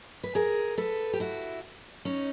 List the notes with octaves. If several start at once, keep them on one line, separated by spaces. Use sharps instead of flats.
B4
G#4 A#4
A4 B4
G4
E4 F#4
C#4 D#4